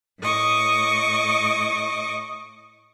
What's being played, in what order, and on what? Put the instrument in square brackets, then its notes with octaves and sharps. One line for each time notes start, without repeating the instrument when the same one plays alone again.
[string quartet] A2 D#5 C#6 D6